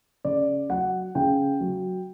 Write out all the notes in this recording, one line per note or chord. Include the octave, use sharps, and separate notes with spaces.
C#3 D5
F#3 F#5
C#3 G5
F#3